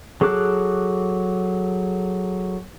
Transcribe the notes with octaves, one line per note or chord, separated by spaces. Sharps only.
F#3 G#4 A4 D6 F#6